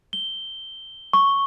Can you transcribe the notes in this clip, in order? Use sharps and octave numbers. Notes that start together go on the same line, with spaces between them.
G7
C#6